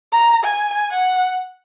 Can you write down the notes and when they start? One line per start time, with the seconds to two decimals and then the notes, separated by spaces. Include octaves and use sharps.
0.12 A#5
0.44 G#5
0.91 F#5